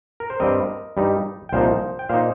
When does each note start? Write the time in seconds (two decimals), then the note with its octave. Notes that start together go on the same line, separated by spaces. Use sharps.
0.20 A#4
0.30 C5
0.40 G2 G3 C4 A#4 D#5
0.97 G2 G3 D#4
1.49 G5
1.53 C2 A#2 F3 D#4 C5 F5
1.99 G5
2.09 A#2 A#3 D#4 C5 F5